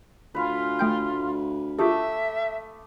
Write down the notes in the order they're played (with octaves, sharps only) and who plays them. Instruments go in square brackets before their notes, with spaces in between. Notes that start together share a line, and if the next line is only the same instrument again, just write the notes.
[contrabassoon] D2 [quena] F4 [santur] B4 F5 G#5
[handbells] A3 G5 G6
[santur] A3 D6 D#6 [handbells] F4 G4 G#4 [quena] E5